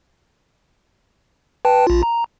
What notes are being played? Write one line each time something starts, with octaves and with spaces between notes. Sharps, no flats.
B4 G5 A5
A#1 F4
A#5